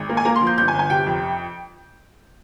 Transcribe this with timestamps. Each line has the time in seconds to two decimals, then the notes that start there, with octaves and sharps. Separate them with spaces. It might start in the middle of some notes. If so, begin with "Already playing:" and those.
Already playing: G#1
0.09 A#3
0.17 G#5
0.25 A#3 A#5
0.36 C6
0.41 F3
0.47 G6
0.58 G1 G6
0.68 G#5
0.74 G1
0.79 G#5
0.90 C3 G5
1.06 F2